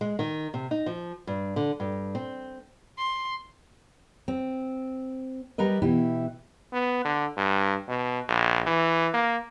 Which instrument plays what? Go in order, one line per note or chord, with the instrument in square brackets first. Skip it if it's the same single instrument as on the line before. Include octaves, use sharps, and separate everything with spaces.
[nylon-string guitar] G#3
D#3
C3
D#4
F3
G2
D3
G2
C4
[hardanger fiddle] C6
[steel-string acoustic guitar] C4
G3 A#4 B4 D#5
B2 E3 E4 G4
[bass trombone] B3
D3
G2
B2
A#1
E3
A#3